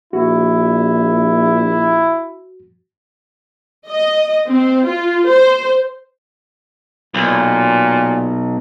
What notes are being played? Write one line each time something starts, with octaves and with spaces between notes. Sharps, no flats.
A#1 E4 F#4
D#5
C4
F4
C5
B1 A#2